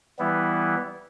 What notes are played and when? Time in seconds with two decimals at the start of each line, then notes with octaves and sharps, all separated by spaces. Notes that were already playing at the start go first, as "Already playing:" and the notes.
0.19 E3 G3 B3 E4